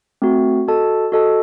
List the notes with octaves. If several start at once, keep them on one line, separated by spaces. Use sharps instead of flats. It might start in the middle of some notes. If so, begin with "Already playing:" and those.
A3 C4 F#4
F#4 A4 D#5 A5
F#4 A4 D#5 A5